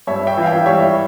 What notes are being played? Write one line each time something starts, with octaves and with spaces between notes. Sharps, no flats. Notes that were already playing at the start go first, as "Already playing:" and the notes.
G2 C#5 E5
E5 G5
E3
F5
E5 G5
G3 C#5 E5